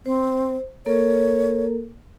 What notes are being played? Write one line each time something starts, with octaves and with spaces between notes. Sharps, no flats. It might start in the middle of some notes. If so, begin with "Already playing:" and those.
C4 C5
A#3 A4 A#4 C#5